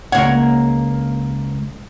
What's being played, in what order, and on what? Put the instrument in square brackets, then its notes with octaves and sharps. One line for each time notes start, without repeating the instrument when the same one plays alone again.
[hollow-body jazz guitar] C#2 G#2 F#5 [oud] A#3 C#5